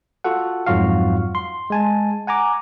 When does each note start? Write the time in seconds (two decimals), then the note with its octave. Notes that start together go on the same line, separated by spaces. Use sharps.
0.24 F4 F#4 A4 F#5
0.67 F2 G#2 F#3 F4 F#4 F5
1.35 C6
1.70 G#3 G#5 A5
2.27 F#5 G#5 A#5 D6